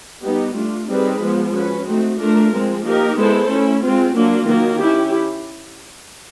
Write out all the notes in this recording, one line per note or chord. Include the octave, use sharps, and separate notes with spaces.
G3 B3 D#4 G4
A3 D4 F4
G3 C4 D#4 G#4 B4
F3 G#3 B3
C#4 F#4 B4
A3 C4 D#4 F#4
A3 D4 F4 A#4
F3 G#3 C4
A#3 D#4 G4 A#4
G#3 B3 E4 A4 C5
A3 C#4 E4
G#3 C4 F4
F#3 A#3 D4 F4
D#3 F#3 A#3
C#4 E4 G4